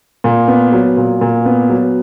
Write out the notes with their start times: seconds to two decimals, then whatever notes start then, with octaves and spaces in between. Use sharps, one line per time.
0.24 A#2
0.48 B3
0.72 F#3
0.97 A#2
1.21 A#2
1.46 B3
1.70 F#3